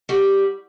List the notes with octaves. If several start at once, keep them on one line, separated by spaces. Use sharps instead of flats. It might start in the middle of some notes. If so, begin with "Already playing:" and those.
G3 F#4